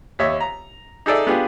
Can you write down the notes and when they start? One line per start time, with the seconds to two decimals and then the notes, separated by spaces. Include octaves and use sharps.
0.19 D#2 C#5 E5
0.40 A#5
1.06 D#4 G#4 A4 D5 E5
1.27 B3 D4 F4 G4 G#4